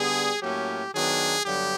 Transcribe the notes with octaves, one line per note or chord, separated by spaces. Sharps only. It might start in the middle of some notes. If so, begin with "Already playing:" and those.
Already playing: D3 G3 B3 G#4
A2 F#3 A#3 C#4 G4
D#3 F#3 B3 D4 G#4
G2 D3 F#3 B3 G4